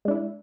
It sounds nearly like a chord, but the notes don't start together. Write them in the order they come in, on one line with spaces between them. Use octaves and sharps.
G#3 D4 E4